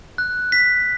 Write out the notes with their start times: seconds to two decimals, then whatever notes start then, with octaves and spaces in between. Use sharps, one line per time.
0.18 F#6
0.52 B6